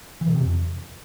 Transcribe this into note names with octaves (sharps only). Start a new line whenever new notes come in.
E3
B2
C3
F2